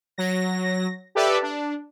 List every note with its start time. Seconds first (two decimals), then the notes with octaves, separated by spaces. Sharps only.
0.18 F#3 A#6
1.15 G4 A4 B4 D5 E5
1.42 D4